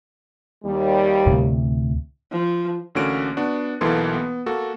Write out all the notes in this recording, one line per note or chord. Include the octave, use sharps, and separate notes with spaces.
D#2 G3
D2 A2 C3
F3
A1 D3 A#3 C#4 F#4 D7
B3 D4 F#4
B1 B2 E3 A#3 A4 C6
B3
A#3 F#4 A4